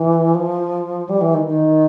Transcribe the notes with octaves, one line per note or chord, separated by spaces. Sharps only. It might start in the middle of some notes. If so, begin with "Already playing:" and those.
Already playing: E3
F3
G3
E3
D#3
D#3